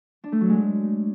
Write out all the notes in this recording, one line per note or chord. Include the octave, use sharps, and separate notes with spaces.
D4
A3
F#3
G#3